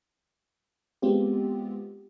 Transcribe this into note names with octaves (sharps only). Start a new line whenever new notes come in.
G#3 B3 C4 F4 G4